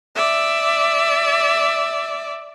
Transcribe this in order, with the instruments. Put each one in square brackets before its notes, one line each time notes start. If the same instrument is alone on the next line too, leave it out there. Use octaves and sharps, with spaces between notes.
[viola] D5 E5